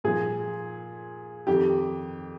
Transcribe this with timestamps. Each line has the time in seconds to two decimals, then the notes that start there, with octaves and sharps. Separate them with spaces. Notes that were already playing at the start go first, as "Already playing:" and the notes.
0.04 A#2 F3 G#4
1.47 F2 D#3 G4